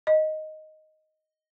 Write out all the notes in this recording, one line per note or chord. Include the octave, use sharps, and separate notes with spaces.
D#5